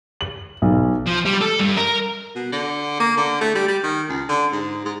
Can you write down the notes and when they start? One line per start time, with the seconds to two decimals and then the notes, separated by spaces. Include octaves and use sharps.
0.21 F#7
0.62 B1
1.06 F3
1.25 G3
1.41 A4
1.60 G2
1.77 A#4
2.35 B2
2.52 D3
3.00 A#3
3.17 D3
3.41 A3
3.55 G3
3.68 G3
3.83 D#3
4.09 C#2
4.29 D3
4.52 G#2
4.85 G#2